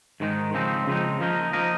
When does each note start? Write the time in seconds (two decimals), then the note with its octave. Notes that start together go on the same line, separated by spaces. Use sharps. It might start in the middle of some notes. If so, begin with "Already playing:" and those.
0.20 G#2 D#3 G#3 D#4
0.54 C#3 F3 G#3 C4 D#4
0.87 C#3 F3 G#3 C4 D#4
1.21 F3 A#3 D#4 A#4 D#5
1.53 F3 A#3 D#4 A#4 D#5